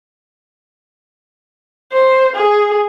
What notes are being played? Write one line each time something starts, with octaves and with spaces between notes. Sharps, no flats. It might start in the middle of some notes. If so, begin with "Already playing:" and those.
C5
G#4